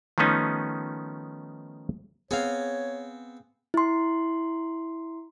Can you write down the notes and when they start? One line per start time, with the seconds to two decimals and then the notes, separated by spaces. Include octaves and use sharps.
0.18 D#3 F3 A3 B3 C#4 D#4
2.31 B3 C4 G#4 C#5 F5
3.74 E4 C6